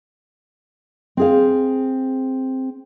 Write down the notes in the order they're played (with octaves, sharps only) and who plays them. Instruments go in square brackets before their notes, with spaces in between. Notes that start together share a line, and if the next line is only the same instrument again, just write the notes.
[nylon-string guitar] C4 G#4 F5